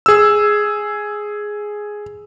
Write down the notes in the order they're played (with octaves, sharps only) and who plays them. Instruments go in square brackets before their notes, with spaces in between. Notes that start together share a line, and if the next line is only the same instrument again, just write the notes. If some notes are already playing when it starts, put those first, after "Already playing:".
[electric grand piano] G#4 E6